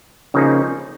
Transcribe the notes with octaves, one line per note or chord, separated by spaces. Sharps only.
C#3 F3 A#3 D#4 G#4